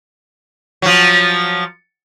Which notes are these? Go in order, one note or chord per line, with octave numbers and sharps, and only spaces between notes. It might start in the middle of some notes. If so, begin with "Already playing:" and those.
F3 F#3